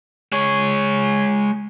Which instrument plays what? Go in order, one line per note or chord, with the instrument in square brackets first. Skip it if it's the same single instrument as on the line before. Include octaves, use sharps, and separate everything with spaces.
[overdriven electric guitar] G#3 C#5